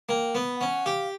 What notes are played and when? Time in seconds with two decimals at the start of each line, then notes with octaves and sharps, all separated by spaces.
0.09 A#3 G5
0.34 B3 F#5
0.60 C#4 F#5
0.85 G4 F5